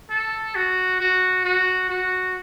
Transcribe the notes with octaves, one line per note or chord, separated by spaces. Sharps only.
A4
F#4
F#4
F#4
F#4